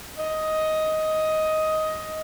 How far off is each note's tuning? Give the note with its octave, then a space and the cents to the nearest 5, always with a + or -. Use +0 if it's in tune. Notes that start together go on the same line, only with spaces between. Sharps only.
D#5 +10